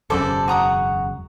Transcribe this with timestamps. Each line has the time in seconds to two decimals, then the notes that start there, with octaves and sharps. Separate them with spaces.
0.10 E1 F#2 C#3 A4 C5 D5
0.48 F#4 A#5 D#6